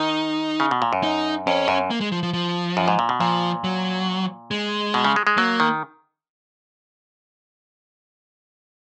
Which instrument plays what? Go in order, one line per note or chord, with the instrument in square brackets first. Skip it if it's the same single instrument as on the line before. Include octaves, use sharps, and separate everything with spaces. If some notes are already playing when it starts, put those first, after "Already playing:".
Already playing: [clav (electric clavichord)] D#3 [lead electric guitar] D#4
[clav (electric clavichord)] C#3
B2
A#2
F#2
[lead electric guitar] D#4
[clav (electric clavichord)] F2 [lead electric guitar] C#4
[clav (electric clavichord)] F#2
[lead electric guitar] A#3
G#3
F3
F3
F3
[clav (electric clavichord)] F#2
G#2
A#2
B2
[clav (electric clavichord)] A#2 [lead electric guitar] F3
[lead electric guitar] F#3
G#3
[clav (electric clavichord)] B2
C#3
G#3
G#3
[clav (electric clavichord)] F#3 [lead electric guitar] A#3
[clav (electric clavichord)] D#3